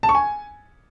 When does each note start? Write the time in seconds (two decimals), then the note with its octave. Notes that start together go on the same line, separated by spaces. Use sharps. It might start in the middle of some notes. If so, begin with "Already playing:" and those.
0.03 A5
0.09 C#6
0.15 G#5